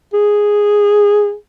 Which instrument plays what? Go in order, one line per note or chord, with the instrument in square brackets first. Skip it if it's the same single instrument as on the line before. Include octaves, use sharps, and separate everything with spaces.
[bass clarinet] G#4